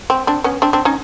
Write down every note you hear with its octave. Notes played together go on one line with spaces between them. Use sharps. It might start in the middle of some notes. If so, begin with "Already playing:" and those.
C4
C4 D4
B3 C#4
C4 D4
C4 D4
C#4 D#4